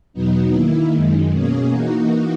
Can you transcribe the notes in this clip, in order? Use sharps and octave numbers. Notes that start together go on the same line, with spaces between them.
E2 B2 F#3 B3 D#4
D#3 A#3 E4
F#2 D#3 G#3
B2 A#3 C#4 G#4
E3 A#3 D#4 F#4